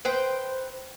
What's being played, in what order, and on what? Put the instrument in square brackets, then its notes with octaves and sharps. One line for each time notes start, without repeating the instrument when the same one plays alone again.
[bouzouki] B4 C5 G5